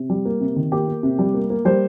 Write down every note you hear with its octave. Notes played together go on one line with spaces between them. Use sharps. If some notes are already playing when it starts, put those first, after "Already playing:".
Already playing: C3
G3
A#3
C3
D#3
A#3 G4
A#3
C3
G3
A#3
A#3
G3 C5